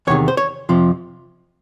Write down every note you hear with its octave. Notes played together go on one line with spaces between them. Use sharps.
E2 C3 D#3 C#5
C5
C#5
F2 C3 F3